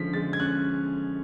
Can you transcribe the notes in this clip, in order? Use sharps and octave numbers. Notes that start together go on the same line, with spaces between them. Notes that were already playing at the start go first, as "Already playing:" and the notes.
Already playing: D3 F3 G#3 C#4 B6
G#3 A6
G#6
C#4 F#6